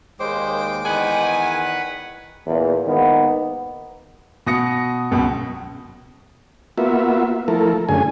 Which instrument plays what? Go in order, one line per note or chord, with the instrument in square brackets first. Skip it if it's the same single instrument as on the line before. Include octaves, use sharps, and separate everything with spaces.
[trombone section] D#2 [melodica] G#3 G5 D6 [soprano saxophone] C5
[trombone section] E2 D#3 [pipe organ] B4 F#5 [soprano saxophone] G#5
[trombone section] E2 A#2
G#2 D#3 A#3 B3
[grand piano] B2 D#6 A#6 C#7
C#2 F#2 B2
[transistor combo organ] A#3 B3 F4 F#4 E5
F3 A3 E4 A4 A#4
F#2 D3 A3 C#4 G#4 G#5